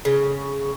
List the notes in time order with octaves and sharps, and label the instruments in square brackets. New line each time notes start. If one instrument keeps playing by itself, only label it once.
[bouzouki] C#3